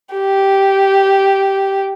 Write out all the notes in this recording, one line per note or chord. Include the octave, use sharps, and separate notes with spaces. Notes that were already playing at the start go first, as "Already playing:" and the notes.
G4